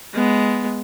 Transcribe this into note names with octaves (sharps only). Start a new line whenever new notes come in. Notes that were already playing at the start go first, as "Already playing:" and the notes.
G#3 B3